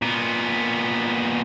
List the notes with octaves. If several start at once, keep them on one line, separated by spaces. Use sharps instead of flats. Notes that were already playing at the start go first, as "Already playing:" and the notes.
A#2 B3